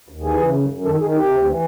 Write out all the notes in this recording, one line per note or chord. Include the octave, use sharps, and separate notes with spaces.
D#2
E3 G#4
C#3
F#2
F#2
D#3 A4
D#3 G#4
C3 G4
D2
E3